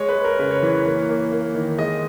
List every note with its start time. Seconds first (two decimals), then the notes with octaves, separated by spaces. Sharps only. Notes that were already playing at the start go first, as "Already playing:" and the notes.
Already playing: G#3 C#5
0.09 B4
0.16 G#3
0.24 A#4
0.39 C#3 B4
0.51 C#5
0.63 E3
0.75 C#5
0.86 A#3
1.09 A#3
1.32 A#3
1.55 D#3
1.78 G#3 D#5